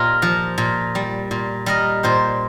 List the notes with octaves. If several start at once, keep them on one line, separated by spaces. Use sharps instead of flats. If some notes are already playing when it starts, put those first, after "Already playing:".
Already playing: A#2 F4 G4 A#4 C5 D#5
F3
A#2
G3
A#2
G3 A#4 D#5
A#2 G4 C5